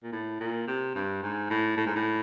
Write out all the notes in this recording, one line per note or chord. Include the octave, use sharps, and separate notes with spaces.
A#2
A2
A#2
C3
G2
G#2
A2
A2
G#2
A2